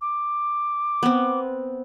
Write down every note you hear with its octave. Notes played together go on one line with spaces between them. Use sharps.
D6
B3 C4